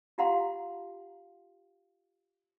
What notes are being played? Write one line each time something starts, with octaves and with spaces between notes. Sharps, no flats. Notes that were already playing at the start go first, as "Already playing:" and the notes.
F4 G4 F5 F#5 A#5 C6